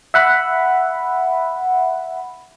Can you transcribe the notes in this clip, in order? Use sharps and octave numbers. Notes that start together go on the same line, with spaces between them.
E5 F#5 B5